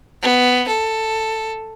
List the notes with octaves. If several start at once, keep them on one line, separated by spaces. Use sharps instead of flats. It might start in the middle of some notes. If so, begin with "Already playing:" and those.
B3
A4